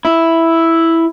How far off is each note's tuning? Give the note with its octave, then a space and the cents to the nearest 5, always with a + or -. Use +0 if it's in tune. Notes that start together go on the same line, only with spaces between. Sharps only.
E4 +0